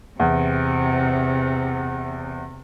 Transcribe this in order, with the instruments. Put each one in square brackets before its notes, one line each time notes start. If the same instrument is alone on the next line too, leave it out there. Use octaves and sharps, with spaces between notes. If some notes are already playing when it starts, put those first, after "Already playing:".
[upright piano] E2 [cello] C3